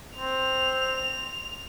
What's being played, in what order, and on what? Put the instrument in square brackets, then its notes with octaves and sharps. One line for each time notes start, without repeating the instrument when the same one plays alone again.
[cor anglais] C4 [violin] F7